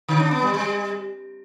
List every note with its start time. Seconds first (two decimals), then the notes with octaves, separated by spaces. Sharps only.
0.08 D3
0.20 D4
0.31 B3
0.42 G3
0.54 G3